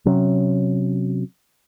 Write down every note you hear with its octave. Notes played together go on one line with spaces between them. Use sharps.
C3 F#3 C#4